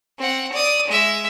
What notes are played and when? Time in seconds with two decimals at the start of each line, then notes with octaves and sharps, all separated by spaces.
0.19 C4 F#5
0.52 D5 D#6
0.87 G#3 E5